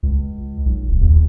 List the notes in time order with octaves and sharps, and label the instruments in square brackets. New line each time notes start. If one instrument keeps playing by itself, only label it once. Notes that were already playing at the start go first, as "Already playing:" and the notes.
[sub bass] C#2
B1
D1
D#2